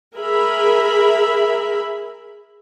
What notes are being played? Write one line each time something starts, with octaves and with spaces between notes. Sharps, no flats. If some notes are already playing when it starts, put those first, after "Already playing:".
G#4 A#4 E5 B5